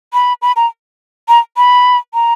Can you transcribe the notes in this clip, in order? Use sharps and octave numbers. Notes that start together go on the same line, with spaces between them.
B5
B5
A#5
A#5
B5
A#5